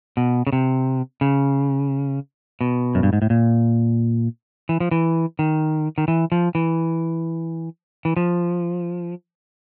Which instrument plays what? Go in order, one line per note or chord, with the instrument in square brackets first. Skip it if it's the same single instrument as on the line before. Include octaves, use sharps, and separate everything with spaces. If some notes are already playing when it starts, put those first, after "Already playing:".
[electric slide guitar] B2
C#3
C3
C#3
B2
F#2
G2
G#2
A2
A#2
E3
F3
E3
D#3
D#3
E3
F3
E3
E3
F3